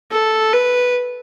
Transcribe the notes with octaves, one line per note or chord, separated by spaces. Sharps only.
A4
B4